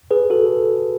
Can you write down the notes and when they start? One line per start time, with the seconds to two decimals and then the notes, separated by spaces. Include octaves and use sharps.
0.11 G#4 B4
0.30 F#4 A4